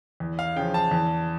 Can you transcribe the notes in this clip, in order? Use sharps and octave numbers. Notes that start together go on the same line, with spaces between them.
E2
F5
C#3 F3 G5
A5
E2